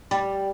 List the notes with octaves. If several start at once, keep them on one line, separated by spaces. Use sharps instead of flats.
G3